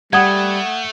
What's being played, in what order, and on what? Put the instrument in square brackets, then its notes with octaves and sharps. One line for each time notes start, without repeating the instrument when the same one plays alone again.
[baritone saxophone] G3 [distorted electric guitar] A3 [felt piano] F#5 [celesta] D#6 G#6